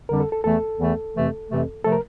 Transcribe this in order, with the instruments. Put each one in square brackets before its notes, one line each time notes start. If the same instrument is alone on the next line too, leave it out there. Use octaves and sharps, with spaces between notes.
[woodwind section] F2 D3 G3 D4 [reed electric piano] A#4
[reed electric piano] A4
A4
[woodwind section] E2 E3 A3 [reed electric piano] A4
[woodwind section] E2 E3 A3
F2 C3 E3 A3
F2 C3 E3 A3
[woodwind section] C3 F3 A3 [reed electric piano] A4
[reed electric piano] A#4